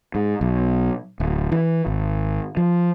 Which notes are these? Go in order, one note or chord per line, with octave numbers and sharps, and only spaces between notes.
G#2
B1
D1
E3
G#1
F3